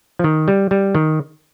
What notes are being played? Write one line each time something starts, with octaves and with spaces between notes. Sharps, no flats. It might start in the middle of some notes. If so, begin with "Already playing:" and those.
F3
D#3
G3
G3
D#3